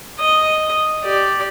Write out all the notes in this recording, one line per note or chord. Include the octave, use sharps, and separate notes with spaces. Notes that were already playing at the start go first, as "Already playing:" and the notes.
D#5
G4 D5